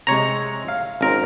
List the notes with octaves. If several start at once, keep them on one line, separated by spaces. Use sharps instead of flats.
C3 G#3 C#5 A#5
F5
G#1 C4 C#4 A#4